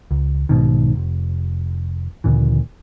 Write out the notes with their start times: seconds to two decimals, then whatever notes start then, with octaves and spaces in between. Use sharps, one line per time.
0.11 C#2
0.49 B1 G#2 B2 D#3
0.95 F1
2.24 D2 A#2 C#3 E3